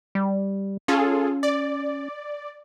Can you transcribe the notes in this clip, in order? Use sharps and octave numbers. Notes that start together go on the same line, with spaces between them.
G3
C#4 F4 G#4 A4
D5